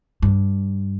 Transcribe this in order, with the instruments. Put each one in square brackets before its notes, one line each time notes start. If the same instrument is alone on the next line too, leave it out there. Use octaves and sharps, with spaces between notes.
[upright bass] G2